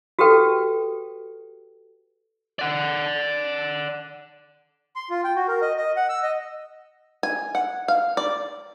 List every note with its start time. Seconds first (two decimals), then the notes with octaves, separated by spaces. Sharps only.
0.19 F#4 G4 A4 B4 G5
2.59 D5 F#5
4.96 C6
5.10 F4
5.24 G5
5.36 F#4
5.48 A#4
5.62 D#5
5.77 D#5
5.97 F#5
6.09 E6
6.23 D#5
7.23 G#5
7.55 F#5
7.88 F5
8.17 D5